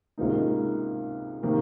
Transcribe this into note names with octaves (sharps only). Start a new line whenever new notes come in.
C#2 C3 D#3 A#3 D#4
C3 D#3 A#3